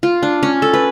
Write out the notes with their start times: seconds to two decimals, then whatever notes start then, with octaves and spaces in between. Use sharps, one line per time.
0.03 F4
0.23 D4
0.43 C#4
0.62 A4
0.73 B4